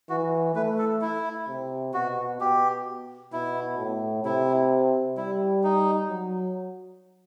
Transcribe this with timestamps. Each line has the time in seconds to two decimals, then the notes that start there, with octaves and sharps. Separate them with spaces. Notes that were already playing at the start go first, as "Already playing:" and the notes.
0.09 E3 F#4
0.55 A3 B4
0.78 A4
1.01 E4
1.48 C3
1.94 B2 F#4
2.41 B2 G4
3.33 B2 E4
3.79 A2
4.24 C3 E4
5.17 G3 E4
5.64 D#4
6.09 F#3